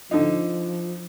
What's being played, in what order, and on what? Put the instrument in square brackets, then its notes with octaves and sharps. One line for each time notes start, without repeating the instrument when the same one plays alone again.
[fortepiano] D3 D#4 [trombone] F3